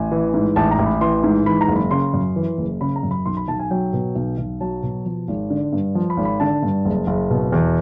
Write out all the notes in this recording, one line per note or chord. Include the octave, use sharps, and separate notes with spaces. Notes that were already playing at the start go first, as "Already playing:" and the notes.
Already playing: A1 G#5
E3
G#2
A1 A5
A#5
A1
B5
E3 C6
G#2
E3 B5
A#5
F#1
B5
C#3 C6
F#2
E3
F#1
C#3 B5
A#5
F#2
B5
B1 C6
B5
B1 A5
G#5
F#3 G5
B2
B1
B1
F#3 A5
B2
F3
G#1
D3
G2
F3
B5
G#1
B5
D3 A5
G2
F#1
F#1
B2
E2